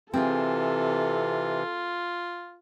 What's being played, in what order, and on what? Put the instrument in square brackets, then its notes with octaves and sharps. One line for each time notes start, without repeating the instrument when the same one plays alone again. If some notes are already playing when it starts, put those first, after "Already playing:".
[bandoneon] C3 E3 [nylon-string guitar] C4 G#4 [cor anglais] F4 [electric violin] A4